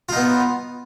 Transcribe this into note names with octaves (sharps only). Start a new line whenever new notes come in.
B3 D#4 F4